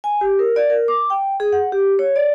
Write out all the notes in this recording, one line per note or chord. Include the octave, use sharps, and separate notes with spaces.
G#5
G4
A#4
D5
A#4
D6
G5
G#4
F#5
G4
C#5
D5